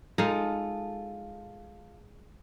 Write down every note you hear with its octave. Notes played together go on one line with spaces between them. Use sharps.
G#3 D#4 F4 A4